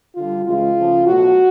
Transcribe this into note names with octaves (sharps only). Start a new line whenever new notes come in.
D3 G3 F4
C#3 E3 G#3 F4
C#3 F3 A3
B2 F#3 A3 F#4